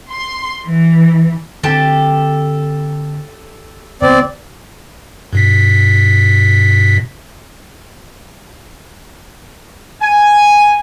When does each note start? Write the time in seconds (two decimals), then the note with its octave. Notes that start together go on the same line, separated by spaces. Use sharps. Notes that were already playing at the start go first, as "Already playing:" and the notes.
0.10 C6
0.63 E3
1.63 D3 C4 G4 A4 A5
4.02 C#2 B3 C4 D5
5.33 G2 B2 B6
10.01 G#5